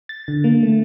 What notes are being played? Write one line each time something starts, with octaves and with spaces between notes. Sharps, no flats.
A6
D3
A#3
A3